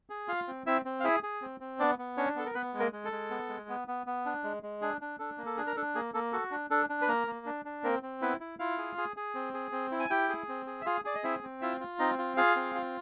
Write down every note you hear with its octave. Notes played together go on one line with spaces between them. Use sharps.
G#4
F4 F5
C4
C4 E4 E5
C4
F5
E4 G#4 E5
G#4
C4
C4
B3 D4 D5
B3
C#4 D4 C#5
B3 A4
A#4
B3 B4
G#3
A#3 A#4
G#3
A4
G#3
B3
G#3
B3
B3
B3
D4
G#3
G#3
D4 G#4
D4
D4 A4
A#3
A4
D4 G#4
A#4
D4 A4
A#3 G#4
A#3 A4
F#4 A4
D4
D4 A4
D4
B4
A#3 A#4
A#3
D4
D4
A#3 C4 A#4
C4
B3 E4 B4
E4
E4 F4 F5
G#4
G#4
G#4
C4
G#4
C4
E4
G#5
E4 G4 G5
G#4
C4
G#4
E5
F4 G#4 F5
G#4 D5
D#5
C4 E4 E5
C4
E4 F4 E5
F4
C4 D#4 D#5
F4
F4 G#4 F5
C4
F4